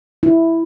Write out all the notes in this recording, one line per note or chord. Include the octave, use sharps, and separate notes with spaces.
E4